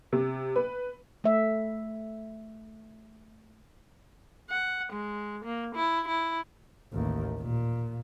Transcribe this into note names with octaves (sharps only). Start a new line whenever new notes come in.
C3
B4
A3 E5
F#5
G#3
A#3
E4
E4
A1 D#2
A#2